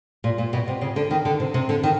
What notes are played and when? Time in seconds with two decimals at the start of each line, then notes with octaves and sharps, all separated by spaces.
0.24 A#2
0.38 A#2
0.53 B2
0.68 C3
0.81 C#3
0.96 D3
1.11 D#3
1.25 D3
1.40 C3
1.54 C3
1.69 D3
1.84 D#3